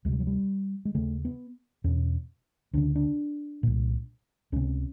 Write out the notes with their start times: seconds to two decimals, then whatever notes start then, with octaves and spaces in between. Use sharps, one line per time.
0.05 D2 G#3
0.09 C3 G3
0.20 F#3
0.27 G3
0.85 G#3
0.95 D#2 C#3 A3
1.25 B3
1.84 E2 B2 C#4
2.73 D2 C#3 D4
2.95 D4
3.63 C2 A#2
4.52 C#2 C3 C#4